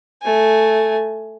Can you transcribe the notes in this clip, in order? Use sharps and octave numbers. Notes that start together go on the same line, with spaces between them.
A3 G#5